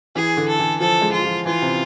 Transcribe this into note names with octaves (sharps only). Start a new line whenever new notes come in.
E3 G#4
D3
A4
E3
F3 A4
G#3
F4
F3
E3 F4
C3